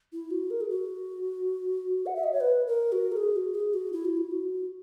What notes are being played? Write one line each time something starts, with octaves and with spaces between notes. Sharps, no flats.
E4
F#4
A#4
G#4
F#4
F#5
E5
D#5
C#5
B4
A#4
F#4
A#4
G#4
F#4
G#4
F#4
E4
F#4
E4
F#4